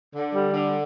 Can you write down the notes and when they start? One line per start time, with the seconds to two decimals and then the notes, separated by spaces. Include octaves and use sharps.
0.13 D3
0.33 G3
0.53 D3